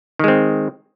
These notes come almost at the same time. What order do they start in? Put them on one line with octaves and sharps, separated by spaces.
D#3 G#3 C4